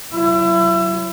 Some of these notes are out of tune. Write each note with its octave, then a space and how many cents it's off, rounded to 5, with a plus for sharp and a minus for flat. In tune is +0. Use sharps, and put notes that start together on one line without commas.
F#3 +10 E4 +30